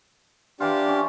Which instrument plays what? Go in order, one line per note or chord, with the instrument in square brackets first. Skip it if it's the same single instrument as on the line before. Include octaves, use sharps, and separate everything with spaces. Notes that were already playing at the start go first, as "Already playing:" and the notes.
[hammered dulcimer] E3 F4 [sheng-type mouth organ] D4 G4
[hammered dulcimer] C#4